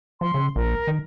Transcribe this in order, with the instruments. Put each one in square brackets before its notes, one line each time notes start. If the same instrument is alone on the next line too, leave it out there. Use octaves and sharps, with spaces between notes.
[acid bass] F3 [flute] C6
[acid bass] C#3
[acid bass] A#1 [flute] A#4
[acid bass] D#3